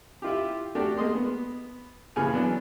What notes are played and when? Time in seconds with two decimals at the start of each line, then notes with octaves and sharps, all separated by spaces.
0.22 E4 F4 G4
0.75 A3 D4 F#4 G4 A#4
0.97 G#3 A#3 D#5 C6
1.15 B3
2.16 A#1 C#3 E3 A#3 G#5 F6
2.33 E3 F#3 B3 D4